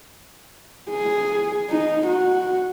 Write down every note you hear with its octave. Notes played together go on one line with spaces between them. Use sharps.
G#4
D#4
F#4